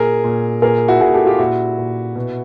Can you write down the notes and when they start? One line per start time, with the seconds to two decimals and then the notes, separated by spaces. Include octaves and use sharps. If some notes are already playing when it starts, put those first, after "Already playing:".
Already playing: A#2 G#4 A#4
0.24 A#2
0.62 A#2 G#4 A#4
0.88 E4 F#4
1.01 A#2 F#4 G#4
1.14 G4 A4
1.26 F4 G4
1.39 A#2 E4 F#4
1.78 A#2
2.15 B2